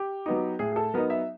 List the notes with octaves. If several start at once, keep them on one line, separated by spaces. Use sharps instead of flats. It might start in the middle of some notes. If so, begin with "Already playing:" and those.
Already playing: G4
F#3 B3 D#4
A2 G#4
G#4
A4
F#3 B3 D#4 A#4
E5